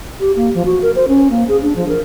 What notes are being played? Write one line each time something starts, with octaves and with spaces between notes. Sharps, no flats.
G4
A#3
F3
F#4
A#4
C5
C#4
A#3
G#4
D4
F3
A#4